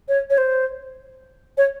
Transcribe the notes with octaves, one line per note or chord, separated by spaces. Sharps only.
C#5
C#5
C5
C#5